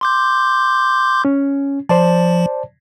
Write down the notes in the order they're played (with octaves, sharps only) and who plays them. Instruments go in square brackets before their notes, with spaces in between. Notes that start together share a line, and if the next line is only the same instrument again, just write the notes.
[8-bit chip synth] C6 D6 G6
[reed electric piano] C#4
[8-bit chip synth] F3 [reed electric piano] C5 D5 A5